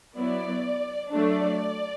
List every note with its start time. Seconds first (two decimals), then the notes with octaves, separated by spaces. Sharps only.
0.17 F#3 B3 E4 D5
1.13 F#3 A3 D4 D5